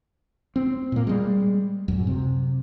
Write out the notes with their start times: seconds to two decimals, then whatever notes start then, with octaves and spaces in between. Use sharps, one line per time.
0.56 C4
0.92 A#2 A#3
1.07 G3 G#3
1.88 D1 F#2
2.07 C3